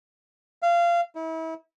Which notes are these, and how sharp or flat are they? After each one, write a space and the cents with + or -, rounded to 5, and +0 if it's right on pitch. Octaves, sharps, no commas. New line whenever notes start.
F5 -20
E4 -35